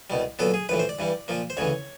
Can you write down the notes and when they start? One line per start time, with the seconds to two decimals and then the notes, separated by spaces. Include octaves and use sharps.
0.10 C2 B2 G3
0.39 A#2 F#3 B3 A4
0.54 G#4
0.69 A#1 A2 E3 B4
0.79 C5
0.89 D5
0.99 G2 E3 G3
1.28 A#2 F3 A#3
1.50 C5
1.57 D2 C#3 E3 C#5